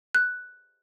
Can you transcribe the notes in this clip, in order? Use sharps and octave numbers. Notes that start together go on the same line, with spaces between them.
F#6